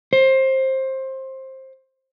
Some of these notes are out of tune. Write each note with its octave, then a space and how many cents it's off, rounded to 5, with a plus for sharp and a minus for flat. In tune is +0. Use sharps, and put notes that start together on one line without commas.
C5 +20